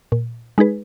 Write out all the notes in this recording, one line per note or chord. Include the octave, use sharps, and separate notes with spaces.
A#2
G#3 D#4 G#4 B4